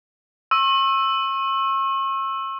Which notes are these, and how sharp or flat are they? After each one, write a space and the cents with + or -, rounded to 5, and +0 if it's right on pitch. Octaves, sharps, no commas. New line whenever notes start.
C#6 -40 E6 +0